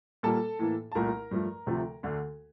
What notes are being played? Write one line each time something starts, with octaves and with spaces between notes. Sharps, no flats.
A#2 G3 A#3 A4 A5
A2 E3 A#3
A5
C2 A#2 A3 A#4 A#5
G2 F3 A3
D2 C3 F3 A3
D2 D3 A3